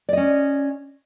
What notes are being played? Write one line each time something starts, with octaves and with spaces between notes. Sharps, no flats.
C#4 D5 D#5